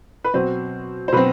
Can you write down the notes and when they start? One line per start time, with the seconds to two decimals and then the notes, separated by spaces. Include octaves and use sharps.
0.24 B4
0.34 B2 F#3 C4 C5
1.08 C5
1.12 B2 F#3 C4 B4